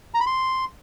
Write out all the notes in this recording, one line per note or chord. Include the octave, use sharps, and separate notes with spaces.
A#5
B5
C6